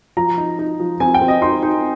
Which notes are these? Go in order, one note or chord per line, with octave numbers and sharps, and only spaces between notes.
F3 A#5
D#4
D#4
F3
C4 G#5
G5
C4
D#5
D#4 C6
D#4